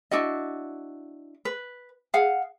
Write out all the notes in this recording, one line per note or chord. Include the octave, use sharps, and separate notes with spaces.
D4 E4 F#4 D#5
B4
G#4 F5 F#5